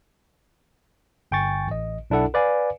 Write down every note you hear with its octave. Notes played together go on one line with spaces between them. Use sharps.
G1 G5 G#5 C#6 A6
A1 D#5
B1 D4 E4 A4 F#5
B4 D5 F5 G#5